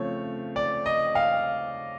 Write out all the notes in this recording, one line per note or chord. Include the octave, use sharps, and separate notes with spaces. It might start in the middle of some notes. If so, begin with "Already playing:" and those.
Already playing: C#3 F3 A3 C4 C#5
D5
D#5
F5